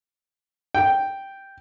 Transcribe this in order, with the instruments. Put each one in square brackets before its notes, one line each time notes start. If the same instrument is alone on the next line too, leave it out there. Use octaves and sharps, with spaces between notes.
[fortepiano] G5